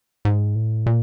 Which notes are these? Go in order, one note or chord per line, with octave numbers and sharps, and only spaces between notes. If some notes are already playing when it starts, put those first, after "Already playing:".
G#2
A2
A#2